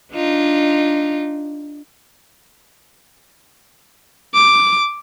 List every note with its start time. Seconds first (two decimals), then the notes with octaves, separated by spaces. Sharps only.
0.12 D4 D#4 F4
4.34 D6